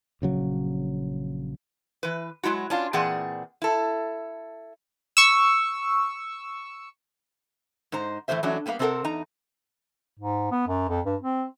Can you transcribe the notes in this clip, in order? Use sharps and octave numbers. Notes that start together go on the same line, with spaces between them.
A#1 C#3 F#3
E3 B4
F#3 G#3 E4 F#4
C#4 D4 F4
A#2 E3 C4 G#4 D5 F#5
E4 A4
C#6 E6
G#2 D#4 C5 A#5
A2 E3 A3 A#3 C5 E5
E3 F#3 A3 C#4 D4
G3 A#3 B3 B4 F5
C3 C4 D4 A4 A#4 F#5
E2 D#4 A#5
G#2
B3
F#2
F2
G2
C4